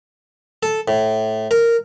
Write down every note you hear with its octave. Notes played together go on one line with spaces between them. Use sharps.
A4
A2
A#4